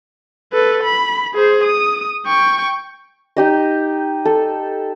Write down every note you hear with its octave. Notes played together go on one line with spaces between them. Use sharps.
A4 B4
B5
G#4 C5
D#6
G5 C#6
D#4 G4 D#5
A4